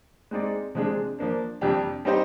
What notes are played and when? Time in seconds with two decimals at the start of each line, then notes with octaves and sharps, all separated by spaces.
0.31 G#3 C4 D#4 G#4 D5
0.75 C3 F3 G#3 D4 G#4
1.19 F3 A#3 D4
1.61 F2 C3 G3 D4 G4
2.05 G3 C4 D#4 G4 C5